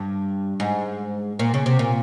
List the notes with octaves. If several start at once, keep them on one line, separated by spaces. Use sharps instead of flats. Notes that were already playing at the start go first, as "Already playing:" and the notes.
Already playing: G2
G#2
A#2
C#3
C3
A#2